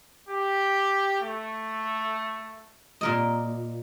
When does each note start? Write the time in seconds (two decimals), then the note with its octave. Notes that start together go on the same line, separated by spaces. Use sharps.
0.29 G4
1.22 A3
3.01 A#2 A#4 D#5